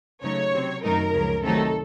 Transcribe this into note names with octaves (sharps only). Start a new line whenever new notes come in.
C#3 F#3 A3 D#4 C#5
C3 F#3 C4
F#2 D#3 F#3 A3 D#4 A#4
C#2 C#3 F3
C3 D#3 F#3 A3 D#4 A4